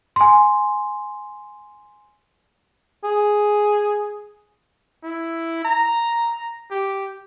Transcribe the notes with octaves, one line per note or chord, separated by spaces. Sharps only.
G#5 C6
G#4
E4
A#5
G4